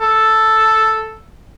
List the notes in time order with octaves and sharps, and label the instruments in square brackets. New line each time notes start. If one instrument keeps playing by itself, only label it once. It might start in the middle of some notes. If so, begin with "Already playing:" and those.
[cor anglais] A4